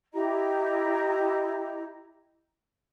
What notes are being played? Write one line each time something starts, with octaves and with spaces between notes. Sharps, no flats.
E4 G4 D#5 A#5